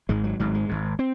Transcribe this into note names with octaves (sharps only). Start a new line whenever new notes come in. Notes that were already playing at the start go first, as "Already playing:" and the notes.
G#1 G#2 G#3
F#3
G#1 G#2 F#3
G#3
G#1 G#2
C4